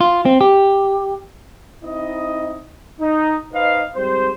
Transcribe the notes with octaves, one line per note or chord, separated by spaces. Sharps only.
F4
C4
G4
C4 D#4 E4 D#5
D#4
D#4 B4 C5 D#5 F5
G#2 G3 C4 C5